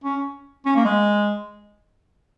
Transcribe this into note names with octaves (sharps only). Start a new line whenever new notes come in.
C#4
C#4
A#3
G#3